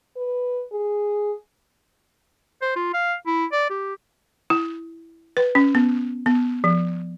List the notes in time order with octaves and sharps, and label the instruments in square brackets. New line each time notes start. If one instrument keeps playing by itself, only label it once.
[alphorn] B4
G#4
[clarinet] C5
F4
F5
E4
D5
G4
[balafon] E4
B4
C#4
B3
B3
F3